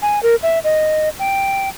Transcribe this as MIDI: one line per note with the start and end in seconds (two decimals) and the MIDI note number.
0.02 0.22 80
0.23 0.35 70
0.43 0.59 76
0.64 1.09 75
1.19 1.69 79